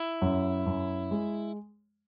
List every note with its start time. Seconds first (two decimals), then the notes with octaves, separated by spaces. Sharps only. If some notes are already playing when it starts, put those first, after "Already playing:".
Already playing: E4
0.22 F#2
0.66 F#2
1.11 G#3